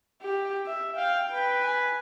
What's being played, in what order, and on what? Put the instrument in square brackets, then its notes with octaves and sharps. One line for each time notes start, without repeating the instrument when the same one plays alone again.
[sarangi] G4
E5
[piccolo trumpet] F5 [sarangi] G5
[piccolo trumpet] B4 [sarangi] G5
[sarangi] G#5